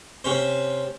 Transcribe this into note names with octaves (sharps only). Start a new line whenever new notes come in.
C3 C#4 C5